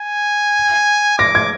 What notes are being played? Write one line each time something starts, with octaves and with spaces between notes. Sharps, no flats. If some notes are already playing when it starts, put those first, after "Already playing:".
Already playing: G#5
D6 A#6
G#6